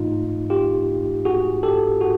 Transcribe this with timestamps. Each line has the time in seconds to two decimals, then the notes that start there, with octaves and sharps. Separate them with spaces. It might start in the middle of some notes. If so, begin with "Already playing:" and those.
Already playing: G#2 E3 A3 D#4 F4
0.50 F4 G4
1.25 F#4 G#4
1.63 G4 A4
2.01 F#4 G#4